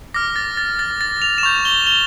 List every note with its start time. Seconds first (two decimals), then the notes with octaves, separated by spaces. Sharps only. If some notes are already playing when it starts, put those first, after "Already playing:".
0.14 D6 F6 A#6
0.36 A6
0.57 A6
0.79 A6
1.01 A6
1.22 F7
1.38 E7
1.43 C#6 G6 F7
1.65 G7
1.87 G7